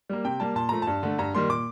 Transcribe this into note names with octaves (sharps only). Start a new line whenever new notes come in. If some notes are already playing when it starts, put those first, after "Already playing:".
G3 A#3
C3 G5
G3 A#3 A5
A#2 A5
F3 A3 A#5
A5
G2
D3 A3
G2 A#5
D#3 G3 A#3 C6
A#2 D6